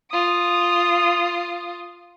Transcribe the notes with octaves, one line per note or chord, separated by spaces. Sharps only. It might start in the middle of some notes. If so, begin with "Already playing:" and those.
F4 D#6